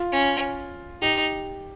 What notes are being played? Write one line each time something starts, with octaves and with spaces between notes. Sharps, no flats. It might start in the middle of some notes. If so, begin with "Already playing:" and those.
Already playing: F4
C#4
D#4 G4